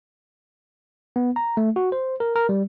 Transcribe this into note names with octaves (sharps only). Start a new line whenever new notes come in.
B3
A#5
A3
F#4
C5
A#4
A#4
G3